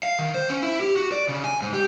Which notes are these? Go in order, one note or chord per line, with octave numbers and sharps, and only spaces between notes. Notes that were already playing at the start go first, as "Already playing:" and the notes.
F5
D#3
C5
C#4
E4
G4
F#4
D5
C#3
G#5
G#2
G4